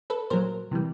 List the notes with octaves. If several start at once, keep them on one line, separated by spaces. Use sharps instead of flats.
A4 B4
A#2 F#3 A#4 C5
C3 E3 G3